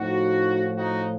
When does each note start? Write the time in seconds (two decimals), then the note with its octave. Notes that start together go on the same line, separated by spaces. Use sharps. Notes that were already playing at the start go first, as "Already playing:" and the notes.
Already playing: A2 F3 D#4 F#4
0.76 D#4 F#4